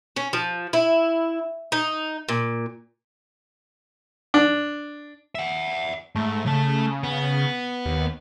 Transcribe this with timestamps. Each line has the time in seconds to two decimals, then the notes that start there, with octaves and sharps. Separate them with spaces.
0.16 C#4
0.33 F3
0.73 E4
1.72 D#4
2.29 A#2
4.34 D4
5.35 E5 F#5
6.15 G#2 A3
6.46 C#3 A3 A5
7.04 B3
7.86 D#2